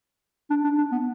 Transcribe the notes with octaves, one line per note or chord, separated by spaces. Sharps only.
D4
D4
D4
B3